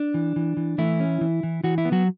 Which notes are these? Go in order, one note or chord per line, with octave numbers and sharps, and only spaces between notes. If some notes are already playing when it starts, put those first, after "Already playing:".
Already playing: D4
E3
E3
E3
E3 A3 E4
C#4
E3
E3
E3 F#4
E4
B3
F#3 F#4